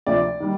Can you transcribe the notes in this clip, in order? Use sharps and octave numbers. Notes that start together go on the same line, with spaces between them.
D2 C3 F3 D5
D#3 G3